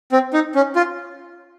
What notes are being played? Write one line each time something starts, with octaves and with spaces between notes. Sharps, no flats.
C4
D#4
C#4
F4